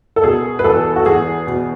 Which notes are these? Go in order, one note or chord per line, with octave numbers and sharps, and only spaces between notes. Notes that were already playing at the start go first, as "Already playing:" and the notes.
A4
B2 G#4
B4
E2 A4
F#4
E2 G#4
B2